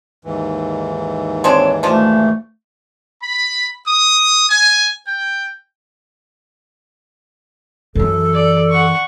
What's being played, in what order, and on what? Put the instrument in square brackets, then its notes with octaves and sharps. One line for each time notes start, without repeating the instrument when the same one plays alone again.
[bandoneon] D#2 G#2 E3
[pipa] G#3 C4 D4 [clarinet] C#5
[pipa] F3 D4 [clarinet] A3
[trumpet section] B5
D#6
G#5
G5
[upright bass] F#2 E3 [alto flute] A4
[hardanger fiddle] D5
F#5 C#6